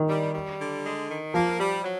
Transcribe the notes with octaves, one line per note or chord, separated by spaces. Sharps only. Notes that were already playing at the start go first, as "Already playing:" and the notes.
Already playing: D#3
G3
G3
D3
G#3
D#3
F3 A#3
G3
F#3